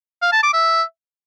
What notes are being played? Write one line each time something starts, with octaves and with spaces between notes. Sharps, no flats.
F5
A5
D6
E5